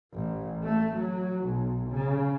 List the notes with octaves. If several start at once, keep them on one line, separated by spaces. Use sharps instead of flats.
A1
A3
F#3
B1
C#3